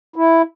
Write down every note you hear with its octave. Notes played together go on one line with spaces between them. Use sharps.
E4